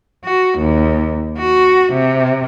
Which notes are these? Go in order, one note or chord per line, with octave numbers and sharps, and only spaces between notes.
F#4
D#2
F#4
C3